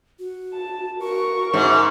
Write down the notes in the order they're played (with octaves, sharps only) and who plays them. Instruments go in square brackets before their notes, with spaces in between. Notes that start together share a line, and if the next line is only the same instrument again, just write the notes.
[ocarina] F#4
[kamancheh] A5
[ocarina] F#4 [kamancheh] A#4 C#6
[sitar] G#2 [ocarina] E5